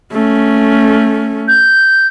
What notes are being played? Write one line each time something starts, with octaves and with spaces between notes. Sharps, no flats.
A3 C#4
G6